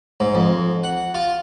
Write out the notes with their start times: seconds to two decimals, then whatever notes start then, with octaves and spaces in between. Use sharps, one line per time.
0.20 G#2
0.35 F2
0.84 F#5
1.14 F4